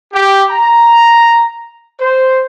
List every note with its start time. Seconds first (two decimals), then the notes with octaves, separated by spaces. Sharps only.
0.13 G4
0.49 A#5
1.98 C5